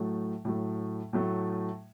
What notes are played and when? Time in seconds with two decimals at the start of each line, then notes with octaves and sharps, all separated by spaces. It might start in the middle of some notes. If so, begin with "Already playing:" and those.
Already playing: A2 F#3 A3
0.45 A2 F#3 A3
1.13 A2 F#3 A3